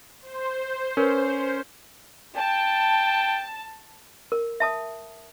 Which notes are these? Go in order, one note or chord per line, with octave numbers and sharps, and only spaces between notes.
C5
C#4 A#4 B4
G5 A5
A#4
E5 A5 D#6